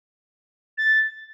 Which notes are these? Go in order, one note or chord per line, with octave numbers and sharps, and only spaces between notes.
A6